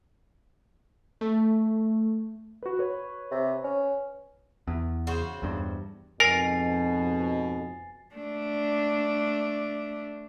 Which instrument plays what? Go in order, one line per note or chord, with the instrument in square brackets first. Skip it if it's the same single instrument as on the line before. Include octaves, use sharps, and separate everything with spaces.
[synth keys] A3
[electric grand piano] F#4 B4
B4 C#5
[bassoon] C3
C#4
[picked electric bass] E2
[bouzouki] C#3 F#4 C5
[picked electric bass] E2 G2
[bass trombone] F2 [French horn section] G#2 B2 [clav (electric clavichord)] A#4 [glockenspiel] G#5 A6 C7
[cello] A3 D4